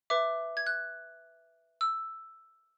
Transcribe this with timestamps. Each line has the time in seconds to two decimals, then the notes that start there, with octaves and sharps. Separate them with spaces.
0.10 B4 E5 D6
0.57 G#6
0.67 F#6
1.81 E6